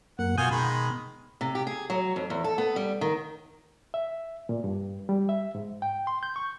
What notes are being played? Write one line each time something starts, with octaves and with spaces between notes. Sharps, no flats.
F#2 A#3 F#5
B2 F4 F#4 G#5 D#6 G6
B2 D#3 G#3 B5
C3
G4
G#4
F#3
F2
E2
A4
B3
G3
D#3
E5
A#2
G2
G3
E5
G#2
G5
C6
G6
C#6